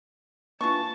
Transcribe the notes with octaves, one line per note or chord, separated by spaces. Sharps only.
E3 A#3 D4 F4 A5 C#6